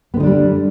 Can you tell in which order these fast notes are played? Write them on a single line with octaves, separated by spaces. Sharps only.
B3 D3 D#4 D4 G3